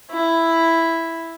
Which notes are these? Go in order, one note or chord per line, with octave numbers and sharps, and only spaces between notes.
E4